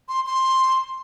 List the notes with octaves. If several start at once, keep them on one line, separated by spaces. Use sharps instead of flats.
C6
C6